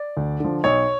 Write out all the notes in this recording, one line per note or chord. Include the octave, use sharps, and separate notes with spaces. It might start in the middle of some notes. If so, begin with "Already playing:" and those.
Already playing: D5
D2
D3 F3
B1 C#5